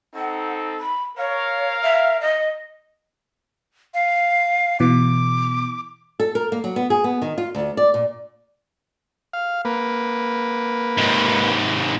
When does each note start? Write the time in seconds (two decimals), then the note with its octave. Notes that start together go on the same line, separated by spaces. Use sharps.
0.15 C4 D#4 A4 F#5
0.79 B5
1.18 A#4 C#5 F5
1.82 E5
2.21 D#5
3.94 F5
4.80 B2 E3 D6
6.20 A4
6.35 A#4
6.52 A#3
6.64 F#3
6.76 B3
6.90 G#4
7.04 B3
7.22 D#3
7.38 F4
7.55 D2
7.77 D5
7.94 A#2
9.33 F5
9.65 A#3 B4
10.97 G#2 C3